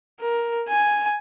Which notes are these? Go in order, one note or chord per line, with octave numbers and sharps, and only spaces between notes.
A#4
G#5